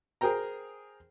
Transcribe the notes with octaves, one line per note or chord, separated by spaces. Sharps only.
G#4 A#4 C5 G5 A#5